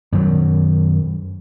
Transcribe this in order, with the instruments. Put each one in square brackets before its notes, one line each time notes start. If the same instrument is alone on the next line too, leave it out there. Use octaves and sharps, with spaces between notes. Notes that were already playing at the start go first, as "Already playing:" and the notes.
[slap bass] F#2 D#3 F#3